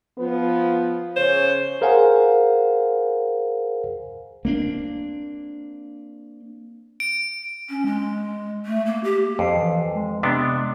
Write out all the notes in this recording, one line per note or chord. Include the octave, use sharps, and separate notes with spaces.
F3 B3
C#3 C5 C#5
G#4 A#4 C5 F5 F#5 G#5
A#3 C4 D4
D7
C#4
G#3
A3
A#3
G4
F2 C7
E3
G#3
C3 B3 D4